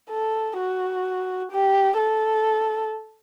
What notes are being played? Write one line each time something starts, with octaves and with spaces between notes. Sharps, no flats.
A4
F#4
G4
A4